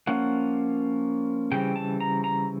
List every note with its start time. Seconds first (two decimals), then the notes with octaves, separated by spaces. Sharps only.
0.07 F3 A#3 C#4 F#5
1.52 C#3 E3 G3 C4 G5
1.76 A5
2.00 A#5
2.24 A#5